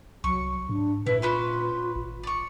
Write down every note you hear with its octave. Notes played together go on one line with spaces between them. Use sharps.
C2 F#3 C#6
G#2 D4
A#2 E4 B4
C#4 F4 B4 C5
G#1
D5 C#6